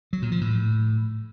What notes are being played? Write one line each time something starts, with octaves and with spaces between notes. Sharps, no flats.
F#3
A#2
F3
A2